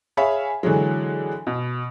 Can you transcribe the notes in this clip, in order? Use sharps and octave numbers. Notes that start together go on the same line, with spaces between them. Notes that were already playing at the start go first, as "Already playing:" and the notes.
G#4 C#5 E5 F5 G#5 B5
D3 E3 F#3 G#3
B2